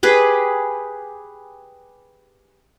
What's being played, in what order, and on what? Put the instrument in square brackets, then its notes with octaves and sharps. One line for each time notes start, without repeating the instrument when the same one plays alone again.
[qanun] G4 G#4 B4